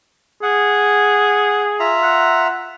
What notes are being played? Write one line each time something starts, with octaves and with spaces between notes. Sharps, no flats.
G#4 F#5
F4 E5 A#5
F#5